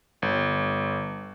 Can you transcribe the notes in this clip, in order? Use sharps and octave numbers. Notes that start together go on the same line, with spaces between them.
G1